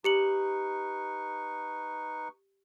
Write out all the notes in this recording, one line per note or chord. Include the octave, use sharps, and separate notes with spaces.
D#4 G4 B4 C#6 C#7 F#7